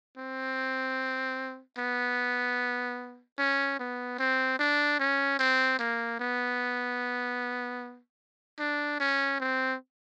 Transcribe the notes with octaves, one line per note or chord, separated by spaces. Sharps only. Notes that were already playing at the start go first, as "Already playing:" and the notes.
C4
B3
C#4
B3
C4
D4
C#4
C4
A#3
B3
D4
C#4
C4